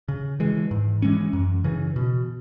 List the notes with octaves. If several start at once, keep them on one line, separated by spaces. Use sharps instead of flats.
C#3
E3 G#3
G#2
E3 G#3 C#4
F#2
C#3 E3
B2